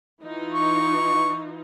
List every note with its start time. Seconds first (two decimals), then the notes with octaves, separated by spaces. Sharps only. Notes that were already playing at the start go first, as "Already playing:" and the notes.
0.21 E3 D#4 F4
0.52 C#6